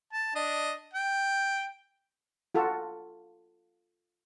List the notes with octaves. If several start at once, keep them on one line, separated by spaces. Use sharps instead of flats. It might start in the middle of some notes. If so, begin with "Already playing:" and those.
A5
D4 D#5
G5
F4 F#4 A4